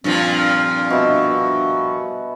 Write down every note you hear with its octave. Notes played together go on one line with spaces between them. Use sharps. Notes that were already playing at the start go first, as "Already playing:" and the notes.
G2 A#2 F3 C4
B2 F#4 E5